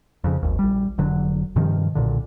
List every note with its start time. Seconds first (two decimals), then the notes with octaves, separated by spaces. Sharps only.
0.24 F2 C#3
0.43 G#1 D#2
0.59 A#1 G3
0.98 F1 D3 F#3
1.56 G2 C3 D#3 F3
1.95 B1 A#2 D3